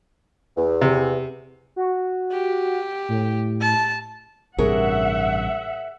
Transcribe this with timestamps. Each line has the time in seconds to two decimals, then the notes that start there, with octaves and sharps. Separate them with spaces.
0.57 E2
0.81 C3
1.76 F#4
2.32 G4
3.09 A2
3.61 A5
4.58 A1 G2 C3 G#4 A#4 C#5 E5 F#5